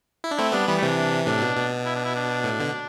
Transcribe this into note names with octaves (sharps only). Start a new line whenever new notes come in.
E4
D4
A3 C4 E4
G3 B3 D4
E3 G3 B3
A3
C3 E3
D4
D4
A2 C3 D4
B2
B2
E4
D4
E4
D4
A2
B2 D3